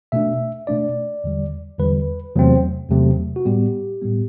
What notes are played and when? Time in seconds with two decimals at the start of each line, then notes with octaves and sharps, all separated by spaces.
0.12 B2 A3 D4 E5
0.67 B2 A3 D4 D5
1.24 E2 D3 G3
1.78 E2 D3 G3 B4
2.35 E2 C3 F#3 A3 C4
2.90 E2 C3 F#3 A3 C4
3.36 F#4
3.45 A2 G3 B3 G4
4.02 A2 G3 B3